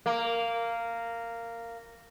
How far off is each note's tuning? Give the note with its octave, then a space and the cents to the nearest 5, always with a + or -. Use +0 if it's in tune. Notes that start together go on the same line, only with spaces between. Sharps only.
A#3 -10